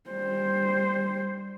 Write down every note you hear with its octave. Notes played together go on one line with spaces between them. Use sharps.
G3 C5